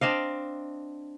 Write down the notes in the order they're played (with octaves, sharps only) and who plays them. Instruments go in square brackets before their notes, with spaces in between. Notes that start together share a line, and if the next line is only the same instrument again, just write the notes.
[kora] C4 D4 D#5 F5